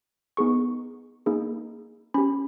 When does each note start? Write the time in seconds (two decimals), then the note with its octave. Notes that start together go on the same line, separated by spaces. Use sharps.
0.37 B3 D#4 G#4 C#6
1.26 A#3 D#4 G#4
2.14 C#4 G4 B5